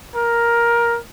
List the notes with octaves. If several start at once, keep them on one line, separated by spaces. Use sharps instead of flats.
A#4